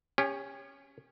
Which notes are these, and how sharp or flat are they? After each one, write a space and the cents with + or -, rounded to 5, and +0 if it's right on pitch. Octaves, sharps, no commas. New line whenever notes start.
C#4 +0 G4 +40